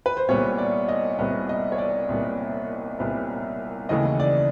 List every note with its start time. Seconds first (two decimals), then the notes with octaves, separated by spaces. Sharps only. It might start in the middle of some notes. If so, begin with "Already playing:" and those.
0.06 B4
0.17 C5
0.28 C2 A#2 G3 B3 C#5
0.58 D5
0.89 D#5
1.19 C2 A#2 G3 B3
1.49 D#5
1.72 C#5
1.78 D5
2.09 C2 A#2 G3 B3
2.99 C2 A#2 G3 B3
3.89 D#2 C#3 E3 A3 D#5
4.20 D5